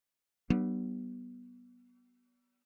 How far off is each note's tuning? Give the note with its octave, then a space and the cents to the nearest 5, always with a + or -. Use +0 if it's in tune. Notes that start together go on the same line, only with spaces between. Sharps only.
G3 -45 B3 -15 D4 +40